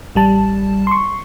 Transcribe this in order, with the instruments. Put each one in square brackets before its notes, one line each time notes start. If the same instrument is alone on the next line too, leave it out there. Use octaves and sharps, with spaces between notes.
[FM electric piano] A1 G3 A5
C6 C#6